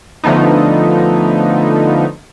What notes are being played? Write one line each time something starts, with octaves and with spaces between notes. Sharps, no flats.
D3 F3 A3 B3 D#4